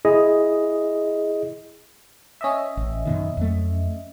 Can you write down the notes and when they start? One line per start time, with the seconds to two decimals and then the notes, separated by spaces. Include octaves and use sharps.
0.05 E4 G#4 D#5
2.41 C#4 D#5 E5
2.77 A1
3.05 F#2 B2 D#3
3.37 F2 F#3 A3